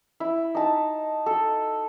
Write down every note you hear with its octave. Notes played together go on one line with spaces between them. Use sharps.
E4
D#4 A5
A4